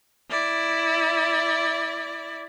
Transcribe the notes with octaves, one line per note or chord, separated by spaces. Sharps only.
E4 D5